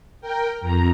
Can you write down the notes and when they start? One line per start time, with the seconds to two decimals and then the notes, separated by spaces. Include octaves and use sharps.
0.21 A#4 G5
0.61 F2 A#5